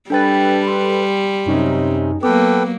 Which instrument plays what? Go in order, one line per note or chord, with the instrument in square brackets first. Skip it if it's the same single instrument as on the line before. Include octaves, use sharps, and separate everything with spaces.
[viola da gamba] G3 [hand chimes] D4 G5 A6 [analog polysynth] A4 B4
[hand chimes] C6
[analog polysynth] F#2 C#4 D#4 [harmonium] C3
[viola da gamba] F#3 A#3 [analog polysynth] B3 [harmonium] A4 B4 G5 [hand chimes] D6